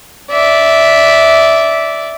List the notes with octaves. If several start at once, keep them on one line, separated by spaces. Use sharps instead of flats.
D5 E5